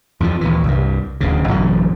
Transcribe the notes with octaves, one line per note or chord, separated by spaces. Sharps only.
F2 A2 E3 F3
D#2 A#2 E3
C2 G2
D1 D2 C#3
A1 F#2 B2 D3